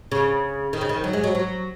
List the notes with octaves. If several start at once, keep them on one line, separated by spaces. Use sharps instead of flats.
C#3
D#3
C#3
D#3
F#3
G#3
F#3
F#3